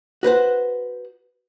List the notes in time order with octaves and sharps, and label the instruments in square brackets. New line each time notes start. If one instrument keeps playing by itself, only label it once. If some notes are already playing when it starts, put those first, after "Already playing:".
[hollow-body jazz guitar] F#4 B4 C5 F#5